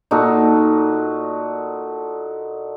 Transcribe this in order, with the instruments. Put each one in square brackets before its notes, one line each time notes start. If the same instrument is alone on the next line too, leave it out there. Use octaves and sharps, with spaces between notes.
[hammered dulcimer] A#2 D#4 F#4 A4